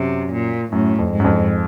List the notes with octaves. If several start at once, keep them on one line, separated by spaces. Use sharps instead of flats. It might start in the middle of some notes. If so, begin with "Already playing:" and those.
Already playing: F#2 C3
A#2
F#2 A2
F2
G#2
F#2
F2